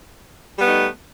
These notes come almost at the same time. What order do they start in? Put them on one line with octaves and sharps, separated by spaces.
G3 B3 A3 D#4